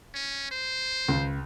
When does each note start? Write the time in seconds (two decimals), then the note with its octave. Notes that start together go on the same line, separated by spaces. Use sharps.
0.14 C#4
0.51 C5
1.09 C#2